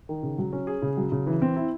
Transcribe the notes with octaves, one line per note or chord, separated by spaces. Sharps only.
D#3
C#3
F#3
C#4
G#4
C#3
F#3
C#3
E3
C4
E4